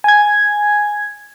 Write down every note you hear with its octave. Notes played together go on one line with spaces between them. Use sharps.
G#5 G#6